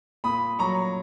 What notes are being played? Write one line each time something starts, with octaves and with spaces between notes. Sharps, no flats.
A#2 B5 D#6
F#3 A#5 C#6